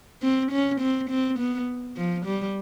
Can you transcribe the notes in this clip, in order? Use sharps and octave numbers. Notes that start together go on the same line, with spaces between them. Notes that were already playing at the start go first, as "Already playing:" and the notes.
C4
C#4
C4
C4
B3
F3
G3